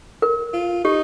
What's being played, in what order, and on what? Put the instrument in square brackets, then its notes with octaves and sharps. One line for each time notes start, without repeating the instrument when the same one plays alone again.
[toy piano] A#4
[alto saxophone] F4
[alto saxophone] D#4 [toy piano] G4